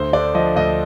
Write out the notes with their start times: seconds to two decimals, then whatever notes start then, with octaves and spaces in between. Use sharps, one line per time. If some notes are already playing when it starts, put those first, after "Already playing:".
Already playing: D2 C5
0.13 D3 D5
0.35 F3 D#5
0.56 D2 D#5